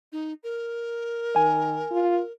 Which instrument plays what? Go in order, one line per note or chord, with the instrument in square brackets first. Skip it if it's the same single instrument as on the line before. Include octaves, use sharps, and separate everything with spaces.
[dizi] D#4
A#4
[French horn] D#3 [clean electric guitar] G#5
[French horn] F4